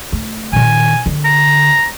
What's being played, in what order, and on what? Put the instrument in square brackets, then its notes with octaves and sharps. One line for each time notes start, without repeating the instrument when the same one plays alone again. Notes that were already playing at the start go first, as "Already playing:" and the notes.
[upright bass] A3
[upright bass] A#2 D#3 [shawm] G#5
[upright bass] D3
[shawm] A#5